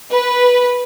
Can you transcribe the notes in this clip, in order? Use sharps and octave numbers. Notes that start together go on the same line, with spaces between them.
B4